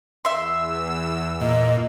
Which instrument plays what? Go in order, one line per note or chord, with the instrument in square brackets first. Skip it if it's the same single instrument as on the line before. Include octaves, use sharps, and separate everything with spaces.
[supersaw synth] E2 E6 [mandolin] E5 C6
[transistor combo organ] A#2 [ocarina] D#5